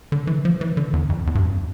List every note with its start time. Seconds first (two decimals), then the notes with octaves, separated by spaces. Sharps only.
0.12 D3
0.27 E3
0.45 F3
0.61 E3
0.77 D3
0.93 E2
1.10 F2
1.27 E2
1.35 G2
1.43 F2